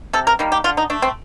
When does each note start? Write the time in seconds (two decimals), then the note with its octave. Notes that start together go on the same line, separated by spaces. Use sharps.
0.13 C3 A4
0.27 A#4
0.39 D#3 G3 A#3
0.52 G4
0.64 D3 F4
0.77 D#4
0.90 A3 D4
1.02 C4